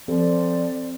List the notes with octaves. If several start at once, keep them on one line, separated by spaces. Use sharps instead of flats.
F3 C4 A4 D5